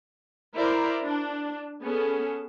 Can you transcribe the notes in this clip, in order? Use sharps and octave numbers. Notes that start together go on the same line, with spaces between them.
E4 A#4 C5 D5 A#5
D4
B3 C#4 G#4 A4